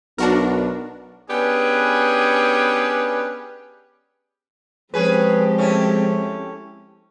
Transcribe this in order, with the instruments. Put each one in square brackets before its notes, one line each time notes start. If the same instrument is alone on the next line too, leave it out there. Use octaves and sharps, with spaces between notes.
[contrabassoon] B1 [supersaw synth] D4 F#4 A#4
[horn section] B3 C#4 D4 G4 G#4 B4
[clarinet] F3 [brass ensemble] G#3 [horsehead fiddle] C4 G4 [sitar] C#4 G#4 B4
[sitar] A3 C#4 E4